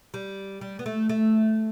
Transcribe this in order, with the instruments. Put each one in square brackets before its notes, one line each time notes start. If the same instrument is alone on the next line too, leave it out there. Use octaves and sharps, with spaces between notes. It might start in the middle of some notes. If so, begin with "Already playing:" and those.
[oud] G3
G3
B3
A3
A3